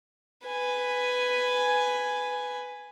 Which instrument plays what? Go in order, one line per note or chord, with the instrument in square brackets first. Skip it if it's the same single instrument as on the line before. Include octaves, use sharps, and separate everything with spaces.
[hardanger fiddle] B4 G#5